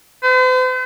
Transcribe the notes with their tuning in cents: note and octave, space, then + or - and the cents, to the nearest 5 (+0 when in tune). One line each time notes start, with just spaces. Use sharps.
C5 -45